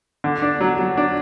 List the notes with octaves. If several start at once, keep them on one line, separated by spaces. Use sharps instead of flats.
D3
D4
F#3
F#3
D4